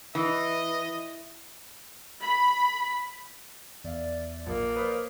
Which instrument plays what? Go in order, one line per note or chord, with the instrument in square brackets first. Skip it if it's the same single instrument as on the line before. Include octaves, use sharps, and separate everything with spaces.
[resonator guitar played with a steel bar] E3 [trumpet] D#5
[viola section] B5
[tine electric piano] E2 E5 F5 [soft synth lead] D5
[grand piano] A#1 [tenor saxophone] A#3 [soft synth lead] D5
[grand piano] B4 C5 [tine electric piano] D#6 F6